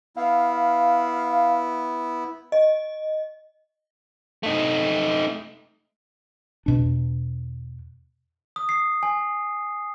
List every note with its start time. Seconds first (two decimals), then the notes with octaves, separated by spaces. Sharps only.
0.16 B3 E4 F5
2.52 D#5
4.43 A3 D#4
6.66 E2 B2 D4
8.56 D#6
8.69 C7
9.03 G#5